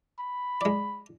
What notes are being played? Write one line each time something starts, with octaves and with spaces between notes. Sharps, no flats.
B5
G#3 D5